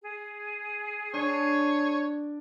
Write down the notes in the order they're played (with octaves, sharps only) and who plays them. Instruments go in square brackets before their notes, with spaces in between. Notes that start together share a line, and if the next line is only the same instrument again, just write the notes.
[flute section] G#4
[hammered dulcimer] D4 [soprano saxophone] C#5